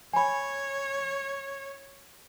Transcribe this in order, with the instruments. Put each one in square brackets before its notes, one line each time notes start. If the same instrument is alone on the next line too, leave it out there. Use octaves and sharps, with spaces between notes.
[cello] C#5 [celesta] G#5 B5